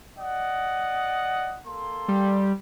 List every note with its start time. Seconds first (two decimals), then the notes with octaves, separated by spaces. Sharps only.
0.17 D5 D#5 F#5
1.65 A#3 A4 C6
2.08 G3